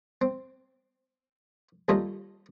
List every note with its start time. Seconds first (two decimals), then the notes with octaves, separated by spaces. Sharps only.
0.21 C4
1.89 D#2 G3 C#4 F4 A4 D#5